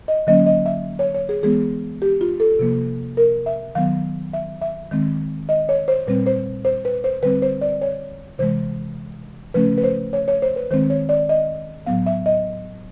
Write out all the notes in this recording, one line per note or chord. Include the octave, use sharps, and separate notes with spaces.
D#5
D3 F#3 A#3 C#4 D#5
D#5
E5
C#5
C#5
G#4
E3 G#3 B3 G#4
G4
F4
A4
C3 F3 A#3
A#4
E5
D#3 F#3 B3 F5
E5
E5
D#3 G#3 C4
D#5
C#5
C5
A#2 G3 C4 B4
C5
C5
B4
C5
D3 G3 C4 B4
C5
D5
C#5
C3 E3 G#3 C5
C#3 F3 A3 C#4 B4
B4
C5
C#5
C#5
C5
B4
D#3 G#3 C4 C5
C#5
D5
D#5
A2 F#3 B3 F5
E5
D#5